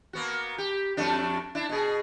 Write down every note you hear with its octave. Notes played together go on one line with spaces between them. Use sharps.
A#3 B3 F#4
G4
F2 A3 D4
D4 E4
B2 G#4